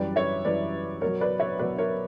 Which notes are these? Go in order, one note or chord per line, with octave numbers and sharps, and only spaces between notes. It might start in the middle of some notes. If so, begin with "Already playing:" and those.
Already playing: F#2 E3 G3 B4 D5
C#5 E5
F#2 E3 G3 B4 D5
B2 F#3 A#4 C#5
B4 D5
C#5 E5
B2 F#3 B4 D5
A#4 C#5